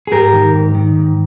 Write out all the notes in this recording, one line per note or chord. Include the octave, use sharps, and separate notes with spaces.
G#4
G#2 G4 A#4
D#3
G#2
D#3
G#2